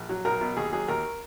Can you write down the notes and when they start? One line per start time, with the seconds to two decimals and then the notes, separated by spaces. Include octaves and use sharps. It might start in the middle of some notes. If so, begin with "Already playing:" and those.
Already playing: A#1
0.09 F#3
0.25 B1 A#4
0.41 B2
0.57 D#2 G#4
0.73 F#3 G#4
0.88 D#2 A#4